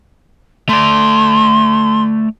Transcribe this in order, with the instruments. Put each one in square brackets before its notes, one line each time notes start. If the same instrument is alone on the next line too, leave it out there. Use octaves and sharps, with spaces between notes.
[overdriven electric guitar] A3 D5 [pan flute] C6